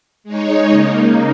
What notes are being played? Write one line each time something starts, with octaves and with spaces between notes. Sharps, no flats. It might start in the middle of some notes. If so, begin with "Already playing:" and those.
G#3 D#4 C#5
C#3 A#3 D#4